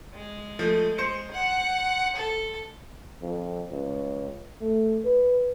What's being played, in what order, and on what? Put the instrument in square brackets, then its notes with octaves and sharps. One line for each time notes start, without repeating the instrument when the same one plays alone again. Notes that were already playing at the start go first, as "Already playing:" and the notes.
[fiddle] G#3
[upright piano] F3 A3
C5 C#7
[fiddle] F#5
A4
[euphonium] F2
C#2
A3
B4